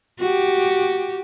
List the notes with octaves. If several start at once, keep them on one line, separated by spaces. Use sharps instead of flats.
F#4 G4